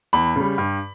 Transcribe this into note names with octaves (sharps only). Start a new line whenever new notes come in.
E2 B5
C#3 G3
G2